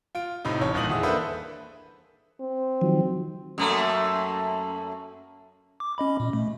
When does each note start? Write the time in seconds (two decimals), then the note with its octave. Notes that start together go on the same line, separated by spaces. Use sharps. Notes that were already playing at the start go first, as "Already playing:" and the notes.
0.15 F4 D7
0.45 A2 C3 D#4
0.61 A1 C#5 A5
0.74 G1 A#2 D#4 D#6 F#7
0.89 E2 E4 G#4 D#6
1.03 A#3 D4 A4 B4 C5 E5
2.40 C4
2.81 D#3 F3 F#3
3.58 F#2 A3 A#3
5.80 D6
5.98 C#4 D#5 B5
6.20 A#2
6.33 A3